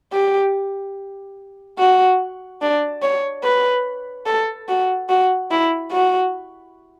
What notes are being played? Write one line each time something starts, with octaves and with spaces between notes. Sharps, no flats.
G4
F#4
D4
C#5
B4
A4
F#4
F#4
E4
F#4